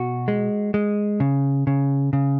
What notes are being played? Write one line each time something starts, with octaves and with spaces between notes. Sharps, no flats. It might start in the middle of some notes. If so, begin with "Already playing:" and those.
Already playing: B2 F#4
G#3
G#3
C#3
C#3
C#3